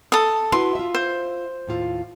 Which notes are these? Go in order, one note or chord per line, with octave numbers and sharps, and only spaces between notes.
A4 D#6
E4 F#4 B4 C6
F4 E5
C5
D#2 A2 F4